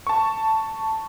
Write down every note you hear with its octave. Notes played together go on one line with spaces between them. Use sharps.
A5 C#6